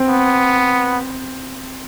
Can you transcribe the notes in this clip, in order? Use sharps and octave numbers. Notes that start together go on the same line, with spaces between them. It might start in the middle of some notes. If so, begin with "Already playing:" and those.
Already playing: C4
B3